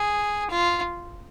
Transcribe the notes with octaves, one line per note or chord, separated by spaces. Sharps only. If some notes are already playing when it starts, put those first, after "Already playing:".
Already playing: G#4
F4